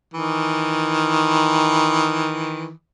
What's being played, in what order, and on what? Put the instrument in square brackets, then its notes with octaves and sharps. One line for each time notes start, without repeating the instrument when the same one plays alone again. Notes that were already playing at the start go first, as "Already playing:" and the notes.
[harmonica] D#3 E3